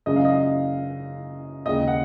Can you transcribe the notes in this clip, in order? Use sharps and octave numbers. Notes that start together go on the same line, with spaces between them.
F#2 C#3 G#3 D#5
F5
D#5
D#2 C#3 G#3 D#5
F#5